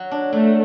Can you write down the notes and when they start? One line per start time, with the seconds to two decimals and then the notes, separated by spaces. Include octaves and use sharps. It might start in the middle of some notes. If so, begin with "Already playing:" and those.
Already playing: F#3
0.11 D4
0.32 F#3 A3